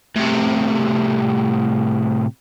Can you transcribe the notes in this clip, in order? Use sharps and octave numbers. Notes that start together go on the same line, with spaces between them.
A2 C3